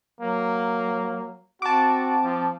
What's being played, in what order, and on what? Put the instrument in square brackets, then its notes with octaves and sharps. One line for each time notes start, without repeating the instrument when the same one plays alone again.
[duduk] F#3 [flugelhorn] A#3
[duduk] C4 [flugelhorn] F#4 [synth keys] A5 D6
[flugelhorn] F3